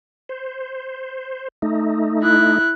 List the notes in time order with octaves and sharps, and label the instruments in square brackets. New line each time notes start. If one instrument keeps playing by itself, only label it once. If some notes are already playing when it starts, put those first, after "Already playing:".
[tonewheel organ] C5
A3 D#4
[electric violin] E4 F#6